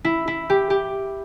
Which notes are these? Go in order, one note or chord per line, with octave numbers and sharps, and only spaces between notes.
E4
E4
G4
G4